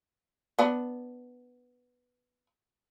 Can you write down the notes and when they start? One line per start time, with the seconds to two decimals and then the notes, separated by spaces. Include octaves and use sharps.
0.59 B3 D4